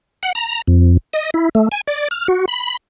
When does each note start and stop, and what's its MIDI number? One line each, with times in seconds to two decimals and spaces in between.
0.23 0.32 78
0.35 0.62 82
0.67 0.97 41
1.13 1.30 75
1.34 1.49 64
1.55 1.69 57
1.72 1.81 80
1.87 2.08 74
2.11 2.27 89
2.28 2.45 66
2.48 2.77 83